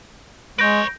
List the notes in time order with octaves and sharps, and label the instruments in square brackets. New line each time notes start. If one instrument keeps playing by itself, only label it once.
[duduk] G#3 [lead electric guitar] B4 C#5 [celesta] G6 A#6 D7